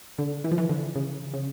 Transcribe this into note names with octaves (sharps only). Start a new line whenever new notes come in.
D3
E3
F3
E3
D3
C#3
C#3